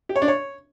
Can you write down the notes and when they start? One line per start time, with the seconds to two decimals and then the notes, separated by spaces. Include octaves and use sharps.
0.09 G4
0.16 C#5
0.22 D4
0.28 C#5